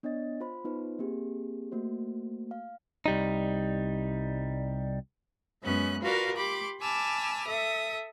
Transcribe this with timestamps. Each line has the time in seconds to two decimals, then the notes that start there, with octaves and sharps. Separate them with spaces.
0.03 B3 D4 C#5 D#5 A6
0.40 F4 C5 B5
0.65 B3 D#4 F4 B4 C5
0.99 A#3 C4 G4 G#4
1.72 A3 A#3 F#4 C5
2.51 F5
3.06 C2 G3 D#4
5.63 F#2 G#3 B3 C#4 F#6
6.02 F4 F#4 A#4 B4 D5 F5
6.35 G4 B5 C6 D6
6.81 G#5 A5 B5 D6 E6 F6
7.48 A4 E5 D#6